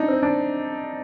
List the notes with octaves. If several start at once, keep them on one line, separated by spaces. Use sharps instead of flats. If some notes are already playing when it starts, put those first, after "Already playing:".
Already playing: D4 D#4
C4
D4